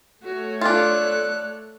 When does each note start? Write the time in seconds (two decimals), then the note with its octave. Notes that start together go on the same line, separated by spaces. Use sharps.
0.23 A3 F#4 C#5
0.61 D4 F4 A4 F#6